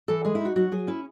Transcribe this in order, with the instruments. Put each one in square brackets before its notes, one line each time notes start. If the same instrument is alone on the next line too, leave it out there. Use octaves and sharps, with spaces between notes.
[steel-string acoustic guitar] E3 A4
G#3 G#4
E4
D#4 F#4
F#3 F#4
F#3 G#4
C#4 E4